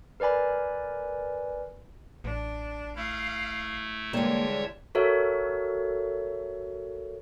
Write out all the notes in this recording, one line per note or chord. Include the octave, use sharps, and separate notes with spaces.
A#4 B4 D5 G#5 B5
A1 D4
A3 E4 F5
D3 E3 G3 G#3 A#3 C#5 E5 A5
F#4 A4 A#4 C#5 E5